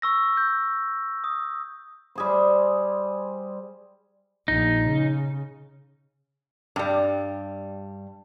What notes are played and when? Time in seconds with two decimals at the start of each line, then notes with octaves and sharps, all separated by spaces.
0.02 C#6 E6 A#6
0.37 G6
1.24 D#6
2.15 G3 G#4 C5
4.48 A#1 D#4
4.83 C#3
6.76 G2 G3